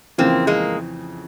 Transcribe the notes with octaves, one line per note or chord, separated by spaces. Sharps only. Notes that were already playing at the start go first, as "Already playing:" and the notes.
F2 C#3 E3 A#3 C4
G#3 A#3